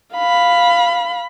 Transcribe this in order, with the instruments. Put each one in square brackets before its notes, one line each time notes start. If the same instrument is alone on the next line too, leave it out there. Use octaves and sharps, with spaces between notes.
[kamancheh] F5 B5